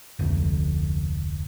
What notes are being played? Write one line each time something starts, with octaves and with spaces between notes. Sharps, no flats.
F1 D2